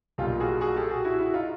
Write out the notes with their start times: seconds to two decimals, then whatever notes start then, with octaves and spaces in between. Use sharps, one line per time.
0.18 B1 A#2 G3 F4 G4
0.40 F#4 G#4
0.61 F#4 G#4
0.76 G4 A4
0.90 F#4 G#4
1.05 E4 F#4
1.19 E4 F#4
1.34 D#4 F4